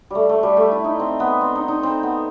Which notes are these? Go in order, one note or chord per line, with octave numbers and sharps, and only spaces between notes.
G3 A3
A3
G3
A3
E4
D#4
C4
B3
C4
D#4
D#4
C4
B3